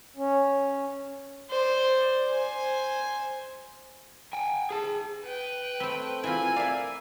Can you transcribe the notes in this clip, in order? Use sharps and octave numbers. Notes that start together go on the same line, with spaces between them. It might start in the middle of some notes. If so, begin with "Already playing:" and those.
C#4
C5 D5
C5 G#5
G5 G#5
G#4 A5
B4 G5
A3 C4 B5
E3 C4 E4 F4 G#5 B5
A#4 D5 E5 F5